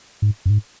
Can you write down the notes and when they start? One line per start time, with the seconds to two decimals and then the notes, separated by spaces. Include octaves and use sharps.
0.22 G#2
0.46 F#2
0.50 G#2